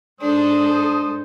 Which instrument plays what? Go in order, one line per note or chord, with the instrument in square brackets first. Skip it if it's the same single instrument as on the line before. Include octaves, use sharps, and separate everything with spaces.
[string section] G#2 A4 [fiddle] D4 [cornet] C5 [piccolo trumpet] D#6